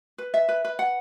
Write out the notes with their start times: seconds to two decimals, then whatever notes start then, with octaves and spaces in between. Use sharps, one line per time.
0.18 B4
0.34 E5
0.49 B4
0.65 B4
0.79 F#5